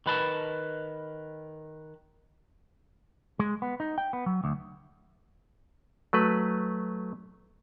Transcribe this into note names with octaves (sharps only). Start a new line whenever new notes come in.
D#3 B4 A5
G#3
B3
D#4
G5
B3
F#3
D2
F#3 A3 B4